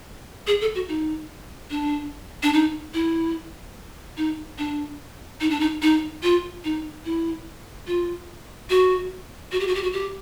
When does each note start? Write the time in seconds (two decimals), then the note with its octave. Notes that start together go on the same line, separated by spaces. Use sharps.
0.47 G#4
0.61 A4
0.75 F#4
0.89 D#4
1.70 D4
2.43 D4
2.53 D#4
2.94 E4
4.17 D#4
4.58 D4
5.41 D#4
5.50 D4
5.60 D#4
5.82 D#4
6.23 F4
6.64 D#4
7.05 E4
7.87 F4
8.70 F#4
9.52 F#4
9.60 G4
9.67 F#4
9.75 G4
9.83 F#4
9.93 G4